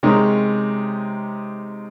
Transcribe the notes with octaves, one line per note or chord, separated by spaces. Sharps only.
C3 G#3 C#4 D#4 A#4